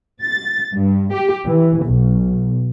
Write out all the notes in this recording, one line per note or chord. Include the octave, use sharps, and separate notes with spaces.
A6
G2
G4
E3
B1